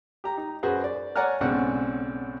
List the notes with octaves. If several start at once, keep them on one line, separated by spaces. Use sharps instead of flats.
G4 A#5
D#4
F#2 F#4 G#4 B4 C5
D5
C#5 D5 F#5 G#5 A#5 F6
B1 G#2 C#3 C4 D4 F#5